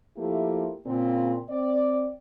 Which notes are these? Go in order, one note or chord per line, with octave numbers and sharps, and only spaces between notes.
F3 A3 A#3 E4 G4
A#2 C#3 C4
C4 D5